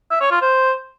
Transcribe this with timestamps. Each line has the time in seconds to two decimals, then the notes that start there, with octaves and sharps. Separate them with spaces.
0.11 E5
0.21 C#5
0.31 F4
0.41 C5